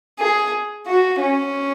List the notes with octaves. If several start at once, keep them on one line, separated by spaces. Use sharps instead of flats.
G#4
F#4
C#4